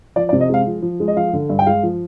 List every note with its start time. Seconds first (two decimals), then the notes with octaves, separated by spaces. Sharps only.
0.16 F3 D5
0.29 D5
0.33 C3
0.40 D#5
0.49 G#3 F5
0.67 F3
0.82 F3
1.00 G#3
1.08 D#5
1.16 F3 F5
1.33 D3
1.49 G2
1.59 G5
1.66 G#3 F5
1.83 F3